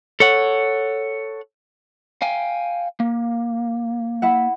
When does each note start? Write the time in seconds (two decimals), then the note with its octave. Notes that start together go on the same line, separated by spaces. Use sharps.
0.20 A4 C#5 F#5
2.22 F5 G5 G#5
3.00 A#3
4.22 E4 E5 F#5